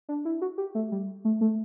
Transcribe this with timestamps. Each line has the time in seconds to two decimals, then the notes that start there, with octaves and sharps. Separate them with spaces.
0.09 D4
0.25 E4
0.42 F#4
0.58 G4
0.75 A3
0.92 G3
1.25 A3
1.41 A3